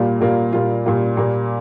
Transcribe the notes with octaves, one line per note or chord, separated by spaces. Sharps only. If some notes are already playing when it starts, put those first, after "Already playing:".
Already playing: A#2 G3 A#3 F4
A#2 G3 A#3 F4
A#2 G3 A#3 F4
A#2 G3 A#3 F4
A#2 G3 A#3